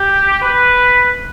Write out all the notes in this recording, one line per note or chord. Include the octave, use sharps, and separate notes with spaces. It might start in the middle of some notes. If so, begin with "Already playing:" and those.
Already playing: G4
B4